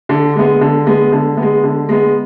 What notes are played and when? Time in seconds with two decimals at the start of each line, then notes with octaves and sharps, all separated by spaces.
0.09 D3
0.35 G#3 B3
0.61 D3
0.86 G#3 B3
1.12 D3
1.37 G#3 B3
1.64 D3
1.89 G#3 B3